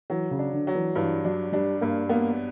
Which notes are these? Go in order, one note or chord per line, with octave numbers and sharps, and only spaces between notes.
E3 F#3
C#3
D4
D3
F#3
E3
G2 E3
F#3 D4
G3 D4
G2 A#3
A#3 B3